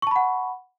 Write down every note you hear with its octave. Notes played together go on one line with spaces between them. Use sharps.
F#5 A5 B5 C#6